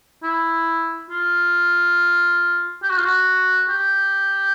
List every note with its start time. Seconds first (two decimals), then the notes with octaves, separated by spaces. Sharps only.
0.23 E4
1.10 F4
2.83 G4
2.90 F#4
2.97 F4
3.05 F#4
3.69 G4